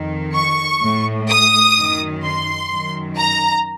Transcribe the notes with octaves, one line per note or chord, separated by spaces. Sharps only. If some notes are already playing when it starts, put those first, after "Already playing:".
Already playing: F2 D#3
C#6
A2
D#6
F#2 D#3
C6
F#2 D#3
A#5